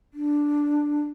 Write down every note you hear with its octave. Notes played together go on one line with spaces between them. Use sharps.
D4